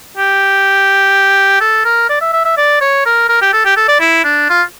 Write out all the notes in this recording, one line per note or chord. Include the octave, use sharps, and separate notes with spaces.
G4
A4
A#4
D5
E5
E5
E5
D5
C#5
A#4
A#4
G4
A4
G4
A4
D5
E4
D4
F4